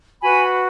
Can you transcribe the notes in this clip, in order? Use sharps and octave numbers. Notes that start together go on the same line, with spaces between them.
F#4 B4 G#5 B5